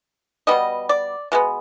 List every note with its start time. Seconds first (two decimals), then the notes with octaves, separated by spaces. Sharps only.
0.47 B2 G3 B3 D#5
0.89 D5
1.32 B2 G#3 B3